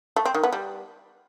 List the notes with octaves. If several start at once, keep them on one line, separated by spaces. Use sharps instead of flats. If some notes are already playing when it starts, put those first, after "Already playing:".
A3
C4
D#3
B3
G3